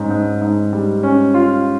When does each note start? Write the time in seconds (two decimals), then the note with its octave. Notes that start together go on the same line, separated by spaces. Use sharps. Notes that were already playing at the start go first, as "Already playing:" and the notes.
Already playing: G#2 C#4
0.10 G#2
0.41 G#2
0.73 G3
1.03 C#4
1.34 F4